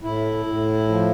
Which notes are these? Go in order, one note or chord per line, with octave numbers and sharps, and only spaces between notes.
A2 E4
A2
F3